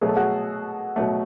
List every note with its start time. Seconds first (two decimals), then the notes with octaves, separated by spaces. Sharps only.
0.01 B2 F#3 A3 G#4
0.09 A4
0.17 F#4 G#4
0.96 B2 F#3 A3